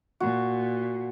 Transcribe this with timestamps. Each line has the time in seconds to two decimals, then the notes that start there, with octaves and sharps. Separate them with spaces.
0.20 A#2 F#4